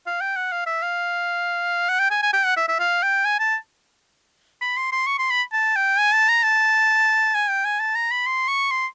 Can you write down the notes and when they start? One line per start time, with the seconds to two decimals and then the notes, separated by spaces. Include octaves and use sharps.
0.06 F5
0.21 G5
0.36 F#5
0.52 F5
0.66 E5
0.82 F5
1.89 F#5
2.00 G5
2.11 G#5
2.22 G#5
2.33 G5
2.45 F#5
2.57 E5
2.68 E5
2.79 F5
3.03 G5
3.25 G#5
3.40 A5
4.61 B5
4.77 C6
4.92 C6
5.07 C#6
5.19 C6
5.31 B5
5.53 A5
5.76 G5
5.99 G#5
6.14 A5
6.29 A#5
6.43 A5
7.35 G#5
7.49 G5
7.65 G#5
7.80 A5
7.95 A#5
8.11 B5
8.26 C6
8.48 C#6
8.71 C6